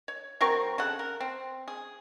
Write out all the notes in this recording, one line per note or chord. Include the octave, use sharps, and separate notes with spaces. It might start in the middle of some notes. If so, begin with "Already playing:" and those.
C#5
F#3 C4 A#4 C#6
C#3 A4 F#5
A#4
C4
G#4